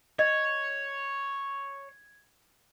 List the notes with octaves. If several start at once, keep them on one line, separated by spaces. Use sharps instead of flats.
C#5 D#5 G#6